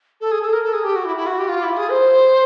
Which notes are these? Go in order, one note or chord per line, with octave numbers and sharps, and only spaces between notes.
A4
G#4
A4
A#4
A4
G#4
G4
F#4
E4
E4
F#4
G4
F4
E4
G#4
C5